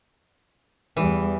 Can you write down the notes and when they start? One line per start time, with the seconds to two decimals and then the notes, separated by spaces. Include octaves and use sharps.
0.97 E2 E3 G3